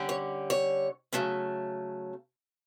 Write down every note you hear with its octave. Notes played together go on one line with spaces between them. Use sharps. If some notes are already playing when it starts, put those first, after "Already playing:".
Already playing: D3 G3 C#4
C#5
C#5
C#3 F#3 A3 C#4